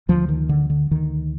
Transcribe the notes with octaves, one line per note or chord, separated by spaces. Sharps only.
D2 D3 F3
D#3
D3
D3
D2 D3 D#3